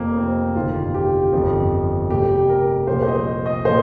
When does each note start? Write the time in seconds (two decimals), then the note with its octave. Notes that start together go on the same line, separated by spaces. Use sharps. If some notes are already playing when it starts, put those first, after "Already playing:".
Already playing: F1 F2 C3 F3 A#3
0.17 C4
0.56 G1 F2 C3 D#3 F4
0.94 G4
1.33 G1 F2 F3
2.10 F1 F2 C3 G4
2.49 A#4
2.87 C2 A#2 F3 C5
3.02 C5
3.07 D#5
3.46 D#5
3.65 A#2 F3 C5